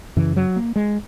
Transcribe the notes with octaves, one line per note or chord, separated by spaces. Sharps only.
F#2 C#3 E3
F#3
A#3
G#3